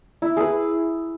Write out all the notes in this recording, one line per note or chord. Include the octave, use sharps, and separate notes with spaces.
E4
G#4 B4